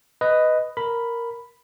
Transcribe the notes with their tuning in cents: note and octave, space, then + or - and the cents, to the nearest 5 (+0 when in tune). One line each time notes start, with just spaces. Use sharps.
B4 +10 D#5 +0
A#4 +0 B5 +0